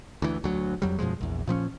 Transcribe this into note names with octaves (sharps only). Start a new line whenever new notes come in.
D2 E3
D2 F#3
F2 F#3 G3
F#2 B2 F3 G#3
A#1 E2
A#2 F3 B3 C#4